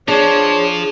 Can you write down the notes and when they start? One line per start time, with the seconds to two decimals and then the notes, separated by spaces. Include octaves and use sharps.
0.08 F3 D4 G#4 C#5